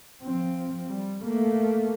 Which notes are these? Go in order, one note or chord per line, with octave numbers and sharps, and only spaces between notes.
F3 C4
G3
A3 A#3